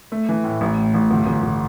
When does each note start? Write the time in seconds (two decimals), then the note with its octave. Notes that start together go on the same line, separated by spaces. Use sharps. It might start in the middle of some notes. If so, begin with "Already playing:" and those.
0.12 A3
0.29 E3
0.44 A2
0.61 A1
0.78 A2
0.94 A1
1.11 G1
1.26 G1
1.43 G1